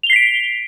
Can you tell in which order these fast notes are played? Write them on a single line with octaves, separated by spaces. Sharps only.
F7 G7 C7 B6 D7